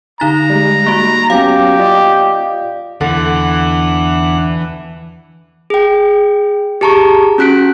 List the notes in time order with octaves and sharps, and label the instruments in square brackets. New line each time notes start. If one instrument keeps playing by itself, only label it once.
[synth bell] D3 D#4 A6 [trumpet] A#5
[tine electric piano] G3 G#3
[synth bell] A#3 F#4
[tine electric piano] F#3 B3 C#4 [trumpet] G4 [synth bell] F5
[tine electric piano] F4 D5 D#5
[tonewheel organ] E2 D4 F#5 [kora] D3 [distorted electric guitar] E3
[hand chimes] G#4 G5
G4 G#4 A5 A#5 C#6
C#4 F#4 F#6 B6 D7